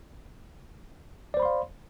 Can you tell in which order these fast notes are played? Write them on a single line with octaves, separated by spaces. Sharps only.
D5 C5 B5 C6 F5